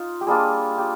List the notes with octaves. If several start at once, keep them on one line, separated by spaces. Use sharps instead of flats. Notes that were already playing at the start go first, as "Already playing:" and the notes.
Already playing: D#4 F4
G4
G3 A#3 D4 F4 G#4
G4